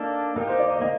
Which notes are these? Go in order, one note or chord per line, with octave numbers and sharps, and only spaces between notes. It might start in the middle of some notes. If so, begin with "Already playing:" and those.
Already playing: A#3 D4 D#4 A4
A#3 D#4 G4 A#4
C5
D5
D#5
A#3 D#5